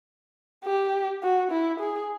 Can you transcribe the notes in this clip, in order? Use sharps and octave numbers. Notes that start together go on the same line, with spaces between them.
G4
F#4
E4
G#4